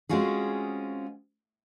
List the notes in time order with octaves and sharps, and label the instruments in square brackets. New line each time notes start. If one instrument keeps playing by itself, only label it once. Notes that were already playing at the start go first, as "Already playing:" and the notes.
[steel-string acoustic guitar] G#3 C4 C#4 F4 F#4 G#4